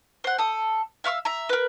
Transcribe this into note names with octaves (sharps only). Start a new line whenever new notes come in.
C5 F#5
A4 D#6
E5 F5 C#6 E6
E5 A#5
A#4 B4